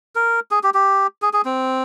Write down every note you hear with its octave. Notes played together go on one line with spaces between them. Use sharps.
A#4
G#4
G4
G4
G#4
G#4
C4